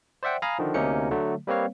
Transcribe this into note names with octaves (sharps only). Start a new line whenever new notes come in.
C5 D5 E5 F#5 G5
F5 G#5 A#5 B5 D#6
D3 D#3 F3
D2 C3 A#3 C#4 D#4 C#7
D3 F#3 A3
G3 A#3 C4 B4 C#5 F5